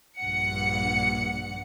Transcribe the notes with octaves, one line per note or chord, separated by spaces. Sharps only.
A#1 G2 F#5 C#7